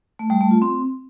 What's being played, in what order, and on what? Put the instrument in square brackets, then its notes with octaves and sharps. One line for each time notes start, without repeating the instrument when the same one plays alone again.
[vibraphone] A3
G3
A3
F4
C4